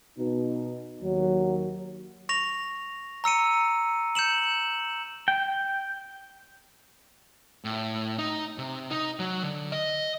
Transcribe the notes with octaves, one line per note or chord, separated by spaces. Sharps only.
B2 D#4
D#2 F#3
C#6 A#6 F7
A#5 E6 C#7 D#7
G6 C#7 E7 F#7
G5
A2
D#4
C3
D#4
F#3
D3
D#5